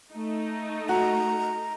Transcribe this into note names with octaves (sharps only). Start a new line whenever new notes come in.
A3 D#4
F#4 A#5